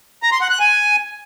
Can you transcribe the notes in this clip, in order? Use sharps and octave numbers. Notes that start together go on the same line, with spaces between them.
A#5
C6
F#5
F#6
G#5